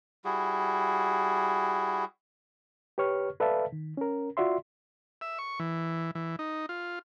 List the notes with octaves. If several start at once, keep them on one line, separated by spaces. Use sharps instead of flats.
G3 E4 F#4 G#4
G4 B4 C#5 C#6 F6
A4 B4 D5 E5 F5 A5
D#3
C#4 A#4
F4 F#4 D5 E5 C6
E5
C#6
E3
E3
D#4
F4